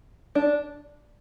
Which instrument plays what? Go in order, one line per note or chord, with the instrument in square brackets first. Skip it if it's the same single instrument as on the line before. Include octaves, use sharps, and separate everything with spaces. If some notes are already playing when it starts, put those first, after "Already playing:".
[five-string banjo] D4